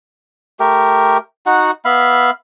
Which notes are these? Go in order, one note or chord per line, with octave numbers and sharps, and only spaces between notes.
A3 G4 A#4
D#4 F#4 F#5
B3 E5 F5 B5